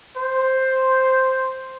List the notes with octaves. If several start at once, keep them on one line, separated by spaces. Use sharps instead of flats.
C5